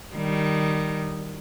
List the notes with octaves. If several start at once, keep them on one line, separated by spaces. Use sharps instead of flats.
D#3 G3